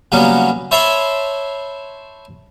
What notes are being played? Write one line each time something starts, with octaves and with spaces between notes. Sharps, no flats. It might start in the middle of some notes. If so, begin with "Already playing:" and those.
C#3 F#3 G3 A#3 B3
C5 C#5 E5 A5 B5 C6